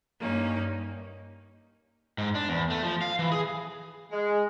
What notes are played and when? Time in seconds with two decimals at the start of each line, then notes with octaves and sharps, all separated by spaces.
0.19 G2 A#3 C#4 D#4
2.18 G#2
2.35 D4
2.49 E2
2.70 A3
2.83 F3
3.02 F5
3.19 E3
3.32 G#4
4.12 G#3